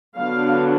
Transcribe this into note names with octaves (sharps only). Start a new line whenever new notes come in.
D3 F#3 B3 D4 F5